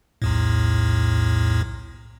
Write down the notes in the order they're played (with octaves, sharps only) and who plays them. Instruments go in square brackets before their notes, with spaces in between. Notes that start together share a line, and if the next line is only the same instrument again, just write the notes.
[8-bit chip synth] B1 E2 A2